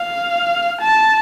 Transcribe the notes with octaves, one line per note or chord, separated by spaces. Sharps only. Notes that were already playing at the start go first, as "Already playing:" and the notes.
Already playing: F5
A5